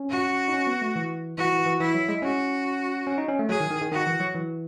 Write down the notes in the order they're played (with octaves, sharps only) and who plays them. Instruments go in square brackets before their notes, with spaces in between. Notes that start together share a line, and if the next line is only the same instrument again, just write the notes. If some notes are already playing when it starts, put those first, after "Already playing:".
Already playing: [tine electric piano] C#4
[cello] F#4
[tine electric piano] D#4
C#4
B3
A3
E3
[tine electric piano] E3 [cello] F#4
[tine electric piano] E3
E3
[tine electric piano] E3 [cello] E4
[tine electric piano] F#3
G#3
[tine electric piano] C#4 [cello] F#4
[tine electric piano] C#4
D#4
C#4
A3
[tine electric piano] F#3 [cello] G#4
[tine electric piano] D#3
D#3
D#3
[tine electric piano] D#3 [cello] F#4
[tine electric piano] E3
F#3
E3